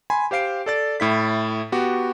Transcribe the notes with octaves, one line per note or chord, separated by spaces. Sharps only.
G#5 B5 C6
G4 C5 F5 C7 D7
A4 D5 A6
A2 E4 B6
B3 F#4 G4